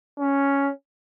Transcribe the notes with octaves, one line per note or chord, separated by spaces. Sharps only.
C#4